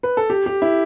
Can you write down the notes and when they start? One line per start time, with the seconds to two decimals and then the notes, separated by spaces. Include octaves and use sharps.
0.03 B4
0.17 A4
0.30 G4
0.46 G4
0.62 E4